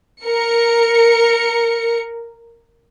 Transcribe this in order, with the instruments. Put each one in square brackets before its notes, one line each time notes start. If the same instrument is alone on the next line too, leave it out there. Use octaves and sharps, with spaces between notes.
[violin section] A#4 C#7